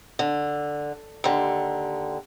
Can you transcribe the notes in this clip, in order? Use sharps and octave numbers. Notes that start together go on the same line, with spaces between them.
D3
D#2 D3